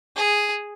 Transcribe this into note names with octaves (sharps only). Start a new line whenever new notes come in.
G#4